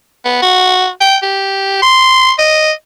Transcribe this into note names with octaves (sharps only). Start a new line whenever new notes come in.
B3
F#4
G5
G4
C6
D#5